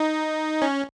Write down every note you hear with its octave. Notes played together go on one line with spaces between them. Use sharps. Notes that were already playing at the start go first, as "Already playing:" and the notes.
Already playing: D#4
C#4